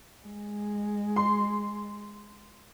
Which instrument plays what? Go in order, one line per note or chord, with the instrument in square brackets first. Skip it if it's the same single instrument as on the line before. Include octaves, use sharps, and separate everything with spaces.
[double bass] G#3
[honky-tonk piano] C6